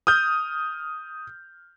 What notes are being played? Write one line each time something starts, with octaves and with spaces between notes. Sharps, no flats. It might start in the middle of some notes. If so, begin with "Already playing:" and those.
D#6 F6 G6